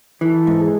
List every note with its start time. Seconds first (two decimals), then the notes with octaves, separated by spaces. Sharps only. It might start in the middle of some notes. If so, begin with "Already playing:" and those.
0.21 E3 A4
0.47 G#2
0.60 G#4